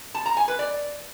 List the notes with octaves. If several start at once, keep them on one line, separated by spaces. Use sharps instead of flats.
A5
A#5
G#5
B4
D5